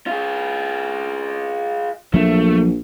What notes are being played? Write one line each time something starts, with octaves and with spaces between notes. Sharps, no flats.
F4 G#4
A#1 F3 F#3 A3 A#3